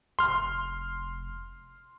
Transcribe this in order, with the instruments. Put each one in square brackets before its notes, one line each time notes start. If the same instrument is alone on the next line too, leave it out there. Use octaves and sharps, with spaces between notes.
[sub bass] F1 [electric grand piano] C6 F6